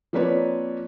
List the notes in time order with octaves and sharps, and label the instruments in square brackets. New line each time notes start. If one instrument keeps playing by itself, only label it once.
[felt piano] F3 A#3 C4 B4 C#5 D5